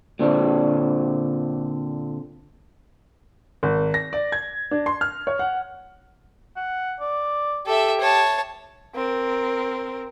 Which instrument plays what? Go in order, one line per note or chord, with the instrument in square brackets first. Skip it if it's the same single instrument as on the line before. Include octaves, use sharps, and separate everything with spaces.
[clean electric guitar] A#2 D3 C4 D4
[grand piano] G#1
A#6
D5
G#6
D4
C6
F6
C#5
F#5
[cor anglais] F#5
D5
[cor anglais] G4 [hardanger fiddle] A4 E5
[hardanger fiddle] C#5 A5
[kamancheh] C4 A#4